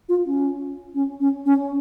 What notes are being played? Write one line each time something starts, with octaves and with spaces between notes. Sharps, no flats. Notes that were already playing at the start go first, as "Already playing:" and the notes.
F4
C#4
C#4
C#4
C#4